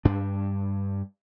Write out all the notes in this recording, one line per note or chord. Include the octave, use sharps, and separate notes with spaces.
G2 D4